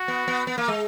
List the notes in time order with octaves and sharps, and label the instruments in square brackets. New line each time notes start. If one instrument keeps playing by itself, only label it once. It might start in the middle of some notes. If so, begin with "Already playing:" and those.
Already playing: [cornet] F#4
[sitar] B3
B3
B3
A#3
G#3